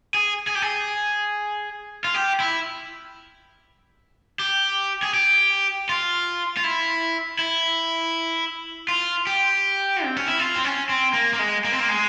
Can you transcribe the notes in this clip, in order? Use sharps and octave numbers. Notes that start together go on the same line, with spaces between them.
G#4
G#4
G4
G#4
F4
G4
E4
G4
G#4
G4
F4
F4
E4
E4
F4
G4
C4
C#4
E4
F4
C4
C#4
C4
A#3
A#3
G#3
A#3
C4
A#3
G#3